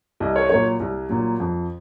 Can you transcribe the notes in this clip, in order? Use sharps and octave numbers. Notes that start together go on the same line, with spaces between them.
C2 D#5
C#5
A#2 F#3 C#5
C2
A#2 F#3
F2